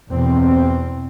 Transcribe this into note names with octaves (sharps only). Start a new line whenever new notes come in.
E2 B2 C4